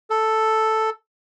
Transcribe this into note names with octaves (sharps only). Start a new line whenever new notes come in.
A4